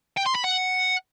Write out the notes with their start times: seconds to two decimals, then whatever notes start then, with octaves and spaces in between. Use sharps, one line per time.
0.17 G5
0.26 C6
0.35 B5
0.44 F#5